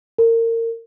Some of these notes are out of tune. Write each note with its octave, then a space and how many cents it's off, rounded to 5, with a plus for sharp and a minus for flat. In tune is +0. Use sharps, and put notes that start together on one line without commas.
A#4 -30